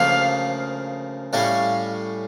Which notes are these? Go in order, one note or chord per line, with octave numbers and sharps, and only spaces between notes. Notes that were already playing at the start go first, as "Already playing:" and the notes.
Already playing: D2 C#3 F3 A#3 F5
A2 G3 C#4 F5